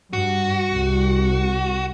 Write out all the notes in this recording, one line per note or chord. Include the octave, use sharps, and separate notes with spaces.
G2 F#4
C2